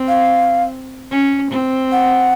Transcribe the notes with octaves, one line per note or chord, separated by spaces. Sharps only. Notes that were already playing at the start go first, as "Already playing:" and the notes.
Already playing: C4
F5
C#4
C4
F#5